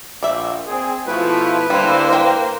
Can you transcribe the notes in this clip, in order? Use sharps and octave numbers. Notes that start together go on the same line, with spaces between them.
A#1 D5 E5
C4 G#4
B2 F3 A3 E4 F4 B4
D3 G3 A#3 D4 E4 C5
A#4 G5